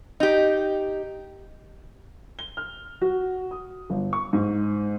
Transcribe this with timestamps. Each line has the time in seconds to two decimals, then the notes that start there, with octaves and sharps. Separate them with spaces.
0.20 D#4 G4
2.39 G7
2.57 F6
3.02 F#4
3.51 D#6
3.90 G1
4.13 C#6
4.33 G#2